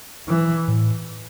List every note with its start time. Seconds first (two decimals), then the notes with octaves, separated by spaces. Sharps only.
0.28 E3
0.68 A2